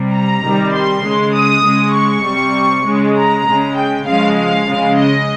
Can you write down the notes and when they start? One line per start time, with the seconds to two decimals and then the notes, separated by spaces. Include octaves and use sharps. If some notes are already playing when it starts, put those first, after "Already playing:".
Already playing: C3 G3
0.13 A#5
0.43 C3 D#3 G3
0.73 C6
1.03 C#3 G#3
1.34 D#6
1.65 C#3 G#3
1.94 C#6
2.25 C3 G3
2.86 C#3 G#3
3.16 A#5
3.46 C#3 G#3
3.76 G5
4.06 C#3 F3 G#3 F5
4.37 F5
4.66 C#3 G#3
4.97 D#5